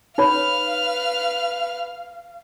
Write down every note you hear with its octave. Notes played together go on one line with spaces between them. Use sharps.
D#4 B4 C#5 F5 B5 F6